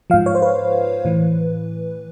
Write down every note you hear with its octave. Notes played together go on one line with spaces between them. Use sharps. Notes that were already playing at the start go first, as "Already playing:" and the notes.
G#2 F3 F5
C#5
C5
B4
A2 E3